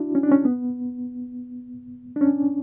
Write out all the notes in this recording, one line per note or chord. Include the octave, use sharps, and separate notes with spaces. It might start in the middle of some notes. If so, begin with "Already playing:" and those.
Already playing: D4 E4 F#4
C#4
D4
C#4
B3
D4
C#4